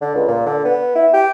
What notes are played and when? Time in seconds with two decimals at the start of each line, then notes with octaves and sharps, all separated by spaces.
0.01 D3
0.15 C#2
0.28 A#2
0.46 D3
0.65 B3
0.95 E4
1.14 G4